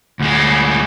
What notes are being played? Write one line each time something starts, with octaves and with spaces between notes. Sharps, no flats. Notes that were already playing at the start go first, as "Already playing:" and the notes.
D2 G#3